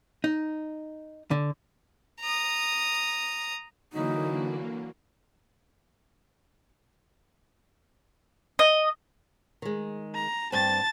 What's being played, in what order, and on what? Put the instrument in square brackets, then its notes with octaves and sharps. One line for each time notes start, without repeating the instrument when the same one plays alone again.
[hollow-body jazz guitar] D#4
D3
[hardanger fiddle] A#5 D#6
[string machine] D3 A#3 [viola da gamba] E3 F#3 F#4 [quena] D#4
[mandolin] D#5
[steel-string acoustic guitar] D#3 G#3
[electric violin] A#5
[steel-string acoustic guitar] G2 C4 [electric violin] A5 A6